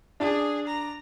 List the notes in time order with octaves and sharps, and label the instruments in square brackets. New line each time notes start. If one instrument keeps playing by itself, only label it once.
[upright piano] D4 [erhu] G#4
[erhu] A#5